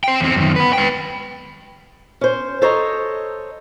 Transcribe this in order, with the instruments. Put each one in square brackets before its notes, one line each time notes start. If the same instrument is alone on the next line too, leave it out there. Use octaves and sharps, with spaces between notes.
[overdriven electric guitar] C5 G5
E2 C4
F#2 D#3
B3 B4
B4 G5
[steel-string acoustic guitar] C#4 C5
A4 C5 C#5 D#5 A#5